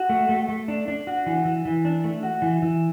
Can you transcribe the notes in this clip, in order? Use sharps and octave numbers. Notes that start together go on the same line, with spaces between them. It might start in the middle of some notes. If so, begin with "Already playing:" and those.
Already playing: F#4
A3
A3
A3
D4
D4
F#4
E3
E3
E3
D4
A3
F#4
E3
E3